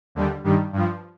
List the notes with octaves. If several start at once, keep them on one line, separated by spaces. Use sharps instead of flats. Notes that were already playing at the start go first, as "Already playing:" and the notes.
D#2 D3 G3
G2 D#3 G3
G2 F3